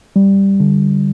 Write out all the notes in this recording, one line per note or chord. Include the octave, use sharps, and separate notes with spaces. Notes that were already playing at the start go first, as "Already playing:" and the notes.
G3
D3